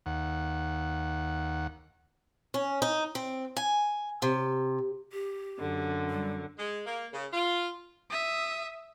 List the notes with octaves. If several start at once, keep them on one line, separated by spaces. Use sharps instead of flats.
D#2 F#5
C#4
D#4
C4
G#5
C3
G4
F#2 D3
G3
G#3
A#3
C#3
F4
E5 D#6